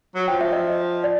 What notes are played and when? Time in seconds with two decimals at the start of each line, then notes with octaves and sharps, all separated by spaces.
0.15 F#3
0.28 F3 G5
0.41 E5
0.53 D#5
1.04 D5